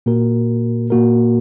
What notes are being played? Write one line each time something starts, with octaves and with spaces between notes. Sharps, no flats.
A#2 A#3 F#4 A#4
A#2 A#3 F#4 A#4